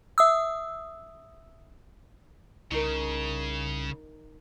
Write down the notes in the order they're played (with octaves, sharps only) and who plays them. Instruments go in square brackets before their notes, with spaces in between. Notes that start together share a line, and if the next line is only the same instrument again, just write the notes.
[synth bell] E5 D#6 E6
[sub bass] C2 [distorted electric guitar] C#3 [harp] D#4 A#4